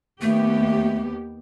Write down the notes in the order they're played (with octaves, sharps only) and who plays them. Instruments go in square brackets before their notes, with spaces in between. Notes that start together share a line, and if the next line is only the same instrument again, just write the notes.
[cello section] D#2 B3 G4 [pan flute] A3